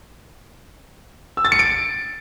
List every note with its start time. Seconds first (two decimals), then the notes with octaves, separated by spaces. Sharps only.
1.37 E6
1.45 A6
1.52 C#7
1.59 D7